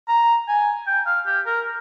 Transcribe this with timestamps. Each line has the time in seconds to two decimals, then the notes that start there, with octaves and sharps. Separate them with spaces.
0.08 A#5
0.48 G#5
0.87 G5
1.06 F5
1.26 G4
1.46 A#4